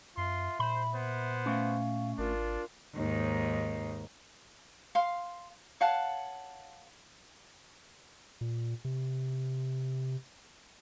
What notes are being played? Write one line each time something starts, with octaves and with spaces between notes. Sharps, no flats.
F#2 F4 E5 C6
A#2 C5 B5
B3 C5
A3 C#4 F5
G#1 D4 F4 A#4
D#2 G#2
F5 C6
C#5 F5 F#5 A5
A#2
C3